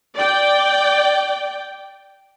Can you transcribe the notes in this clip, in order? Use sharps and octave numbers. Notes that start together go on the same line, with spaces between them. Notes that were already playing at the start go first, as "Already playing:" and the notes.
D5 G5